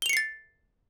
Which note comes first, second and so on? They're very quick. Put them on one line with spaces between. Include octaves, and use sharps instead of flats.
G7 F7 C#7 C7 A6